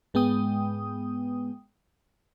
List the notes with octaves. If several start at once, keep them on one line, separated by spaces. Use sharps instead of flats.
G#2 G#3 B3 G5 D#6